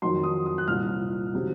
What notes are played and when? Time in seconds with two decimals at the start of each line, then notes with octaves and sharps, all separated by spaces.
0.02 F2 D#3 F#3 C6
0.23 D#6
0.46 D#6
0.58 F#6
0.67 C2 A#2 F3 F6
1.34 C3 D#3 F#3